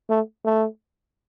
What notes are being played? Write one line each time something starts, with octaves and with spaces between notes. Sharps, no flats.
A3
A3